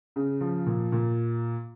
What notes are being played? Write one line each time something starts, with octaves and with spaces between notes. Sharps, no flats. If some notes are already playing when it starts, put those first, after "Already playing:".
C#3
F3
A#2
A#2